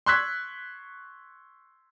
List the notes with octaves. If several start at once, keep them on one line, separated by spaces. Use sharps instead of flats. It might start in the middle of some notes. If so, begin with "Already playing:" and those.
C6 C#6 E6 F#6 G#6 B6